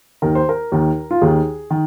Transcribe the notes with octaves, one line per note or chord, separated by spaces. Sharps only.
D#2 D#3 A#4
C5
A#4
D#2 D#3
F4
D#2 D#3 G#4
D#3